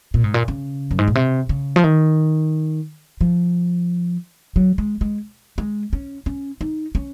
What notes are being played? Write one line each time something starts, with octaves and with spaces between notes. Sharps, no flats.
A#2
G#2
A#2
C#3
F#2
G#2
A#2
C3
C#3
F3
D#3
F3
F#3
G#3
G#3
G#3
C#4
C#4
D#4
C#4